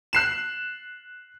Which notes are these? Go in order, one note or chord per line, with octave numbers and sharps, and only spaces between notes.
F#6 C7 E7